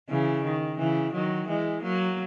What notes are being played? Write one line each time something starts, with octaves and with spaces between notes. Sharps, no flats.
C#3 E3
D#3
C#3 E3
D#3 F#3
E3 G#3
F#3 A#3